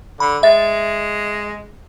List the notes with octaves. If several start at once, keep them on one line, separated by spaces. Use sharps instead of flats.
D3 B5
G#3 E5 A6